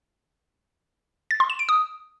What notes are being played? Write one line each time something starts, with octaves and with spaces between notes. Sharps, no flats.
A6
C6
E7
D7
D#6